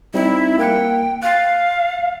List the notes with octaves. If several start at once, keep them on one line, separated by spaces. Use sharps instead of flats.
G3 C4 D#4 E4
A#3 G5 F#6 C#7
F5 F#6 A6